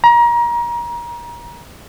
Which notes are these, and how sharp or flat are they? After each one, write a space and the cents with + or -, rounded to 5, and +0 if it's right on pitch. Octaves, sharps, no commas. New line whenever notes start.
A#5 +30